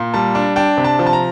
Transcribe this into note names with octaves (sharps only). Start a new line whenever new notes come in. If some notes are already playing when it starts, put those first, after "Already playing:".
Already playing: A#2
G3 A5
D4
D4 G5
C3
A5
F3
A5
A#5